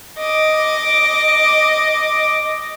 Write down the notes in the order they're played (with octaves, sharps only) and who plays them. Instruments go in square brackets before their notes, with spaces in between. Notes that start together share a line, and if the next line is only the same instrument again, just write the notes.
[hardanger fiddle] D#5 D6